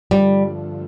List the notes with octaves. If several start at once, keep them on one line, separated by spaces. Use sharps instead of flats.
G2 D3 F3 G3 A3